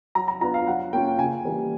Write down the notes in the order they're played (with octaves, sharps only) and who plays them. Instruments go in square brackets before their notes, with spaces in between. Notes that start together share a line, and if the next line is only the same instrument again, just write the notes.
[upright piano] F#3 A#5
A#5
B3 D4 F4 A#5
F5
F#3 F#5
A#3 C#4 F4 G5
C#3 G#5
E3 G3 A#3